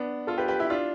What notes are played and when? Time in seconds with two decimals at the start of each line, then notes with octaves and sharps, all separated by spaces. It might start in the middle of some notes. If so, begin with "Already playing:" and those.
Already playing: B3 D4
0.27 F4 A4
0.38 G4 B4
0.48 G4 B4
0.60 E4 G4
0.70 D4 F4